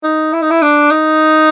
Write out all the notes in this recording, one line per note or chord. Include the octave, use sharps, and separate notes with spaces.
D#4
E4
D#4
E4
D4
D#4